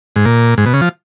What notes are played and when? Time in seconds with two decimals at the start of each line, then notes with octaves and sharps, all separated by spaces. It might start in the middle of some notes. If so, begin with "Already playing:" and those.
0.16 G#2
0.26 A#2
0.58 G#2
0.66 B2
0.74 C#3
0.82 F3